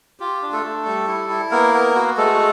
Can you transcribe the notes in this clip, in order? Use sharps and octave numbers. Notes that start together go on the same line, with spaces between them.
F4 G4
D4
A3 A4
A3
G3
E4
E4
A#3 B3 A#4
B3
F#4
G#3 A3 A4